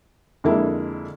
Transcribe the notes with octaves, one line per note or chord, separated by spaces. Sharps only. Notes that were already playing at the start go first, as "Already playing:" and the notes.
F2 D3 G#3 A#3 E4